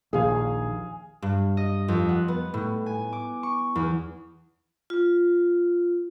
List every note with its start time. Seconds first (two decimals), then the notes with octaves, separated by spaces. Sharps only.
0.13 A#1 D#2 G#4 F5 G#5
1.22 G2
1.57 D#5
1.88 F2
2.09 F#5
2.28 B3
2.54 A2
2.86 G#5
3.13 D6
3.43 C#6
3.75 E2
4.90 F4